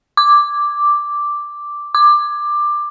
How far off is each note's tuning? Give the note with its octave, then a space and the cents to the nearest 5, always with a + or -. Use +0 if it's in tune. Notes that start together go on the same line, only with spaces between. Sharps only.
D6 +0
D6 +15